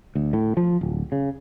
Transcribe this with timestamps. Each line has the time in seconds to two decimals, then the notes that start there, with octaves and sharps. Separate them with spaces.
0.15 D2
0.33 A2
0.57 F3
0.81 D1
1.12 C#3